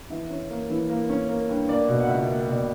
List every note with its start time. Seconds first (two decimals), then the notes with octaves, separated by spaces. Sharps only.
0.10 E3 E5
0.30 C#4
0.50 A#3
0.70 E3
0.89 A#3
1.09 C#4
1.29 A#3
1.49 G2
1.68 A#3 D5
1.89 B2
2.00 F#5
2.08 C#2 E5
2.28 A#3
2.48 B2 D5